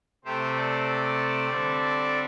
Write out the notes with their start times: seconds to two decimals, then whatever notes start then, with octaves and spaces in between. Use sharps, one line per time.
0.25 C3 A3 C4 G4 C5
0.56 A4 D5
1.49 D3 G3 C4